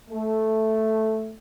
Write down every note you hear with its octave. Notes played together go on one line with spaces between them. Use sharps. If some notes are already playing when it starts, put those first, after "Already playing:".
A3